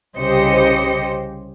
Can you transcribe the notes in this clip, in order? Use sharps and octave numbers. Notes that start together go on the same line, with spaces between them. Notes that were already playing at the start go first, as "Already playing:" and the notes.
C2 C#3 G4 C5 D#5 C#7